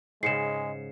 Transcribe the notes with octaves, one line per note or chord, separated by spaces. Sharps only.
G#2 C#3 G#3 C7 C#7 E7